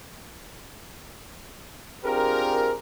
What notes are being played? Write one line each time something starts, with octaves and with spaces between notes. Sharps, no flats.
C4 D4 F4 G4 G#4 A#4